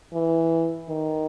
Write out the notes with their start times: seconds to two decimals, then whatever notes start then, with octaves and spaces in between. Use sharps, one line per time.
0.13 E3
0.89 D#3